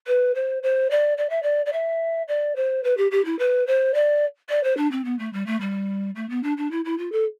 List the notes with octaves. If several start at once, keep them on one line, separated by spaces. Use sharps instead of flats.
B4
C5
C5
D5
D5
E5
D5
D5
E5
D5
C5
B4
G4
G4
E4
B4
C5
D5
D5
C5
D4
C4
B3
A3
G3
A3
G3
A3
B3
D4
D4
E4
E4
F4
A4